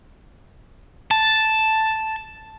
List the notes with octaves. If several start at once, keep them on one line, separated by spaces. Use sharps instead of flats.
A5